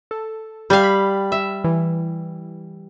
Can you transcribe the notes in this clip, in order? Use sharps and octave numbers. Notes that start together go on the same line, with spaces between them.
A4
G3 F5
B5
E5
E3